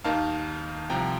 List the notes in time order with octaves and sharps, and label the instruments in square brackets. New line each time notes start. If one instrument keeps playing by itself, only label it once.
[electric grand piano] D#2 D#3 A#3 D#4 F5 A5
C2 C3 F3 G5 A#5